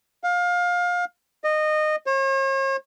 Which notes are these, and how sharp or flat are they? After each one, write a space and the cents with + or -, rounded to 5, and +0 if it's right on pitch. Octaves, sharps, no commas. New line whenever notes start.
F5 +25
D#5 -20
C#5 -45